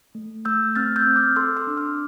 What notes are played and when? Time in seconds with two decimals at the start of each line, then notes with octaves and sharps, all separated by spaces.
0.15 A3
0.45 A3 E6 G6
0.76 C4 F6 A6
0.96 E6 G6
1.06 C4
1.16 D6 F6
1.36 A4 C6 E6
1.57 C6 E6
1.67 D4
1.77 D6 F6